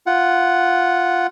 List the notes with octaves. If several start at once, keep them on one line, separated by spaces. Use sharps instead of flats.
F4 F#5